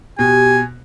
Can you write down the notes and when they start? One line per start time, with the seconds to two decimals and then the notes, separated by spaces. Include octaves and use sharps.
0.19 B2 G4 G#5